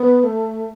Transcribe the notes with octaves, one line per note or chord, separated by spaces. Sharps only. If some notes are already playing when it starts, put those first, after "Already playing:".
Already playing: B3
A3